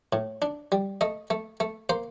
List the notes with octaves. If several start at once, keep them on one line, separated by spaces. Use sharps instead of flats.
A2
D4
G3
A3 D#5
A3
A3
A#3 C5